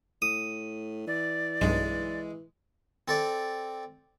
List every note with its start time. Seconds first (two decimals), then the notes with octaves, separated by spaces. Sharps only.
0.22 A2 D#6
1.07 E3 D5
1.61 B1 G2 G#3
3.08 C4 A4 D5